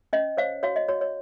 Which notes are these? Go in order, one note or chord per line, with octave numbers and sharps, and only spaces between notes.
C#4 D#5
C5 C#5 F5
F#4 C#5 F5
D#5
F#4 C#5
C#5